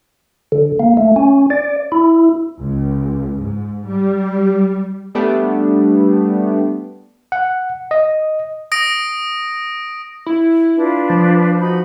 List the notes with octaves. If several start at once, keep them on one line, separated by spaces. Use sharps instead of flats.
D3
A#3
A3
C#4
D5
E4
C#2
G#2
G3
G3 A3 B3 D4 G4
F#5
D#5
D#6 A#6 D7
E4
D4 F4 B4
F3
D#4 F#4 B5